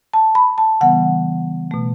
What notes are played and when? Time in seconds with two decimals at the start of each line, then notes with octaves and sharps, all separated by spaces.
0.13 A5
0.35 B5
0.58 A5
0.81 C#3 E3 G3 B3 F#5
1.71 B2 A3